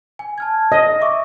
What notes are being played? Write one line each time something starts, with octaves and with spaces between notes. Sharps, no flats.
G#5
A5 F6 G#6
D#5 A#6
E5 C#6 D6